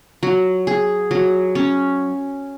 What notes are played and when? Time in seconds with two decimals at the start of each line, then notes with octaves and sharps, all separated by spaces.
0.23 F#3
0.67 G#4
1.11 F#3
1.55 C#4